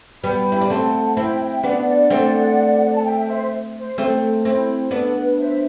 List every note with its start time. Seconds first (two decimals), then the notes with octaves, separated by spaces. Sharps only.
0.23 G3 B3 G5 B5
0.52 E4
0.61 D4
0.70 A3 C4 F#5 A5
1.17 C4 E4 E5 G5
1.40 E5 G5
1.64 B3 D4 D5 F#5
1.87 D5 F#5
2.10 A3 C4
2.94 A5
3.04 E5 G5
3.28 C5 E5
3.75 C5
3.98 A3 C4
4.45 C4 E4
4.87 G4
4.91 B3 D4 A4
5.15 B4
5.38 C5 E5